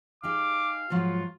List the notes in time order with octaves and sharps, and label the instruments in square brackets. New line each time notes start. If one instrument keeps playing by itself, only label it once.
[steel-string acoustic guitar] D#4 G4 G#4 [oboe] F5 [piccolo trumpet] D6
[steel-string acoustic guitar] G#2 F3 F#3 [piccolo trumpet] F4